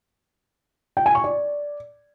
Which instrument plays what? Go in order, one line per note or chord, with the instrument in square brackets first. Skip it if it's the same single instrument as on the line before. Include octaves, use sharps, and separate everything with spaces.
[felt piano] G5
G#5
C#6
D5